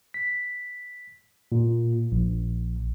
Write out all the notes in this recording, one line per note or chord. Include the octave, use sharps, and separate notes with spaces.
B6
A#2
A#1